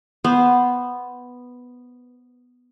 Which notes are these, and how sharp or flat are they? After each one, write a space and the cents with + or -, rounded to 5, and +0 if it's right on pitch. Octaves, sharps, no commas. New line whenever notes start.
B3 +0 C5 -5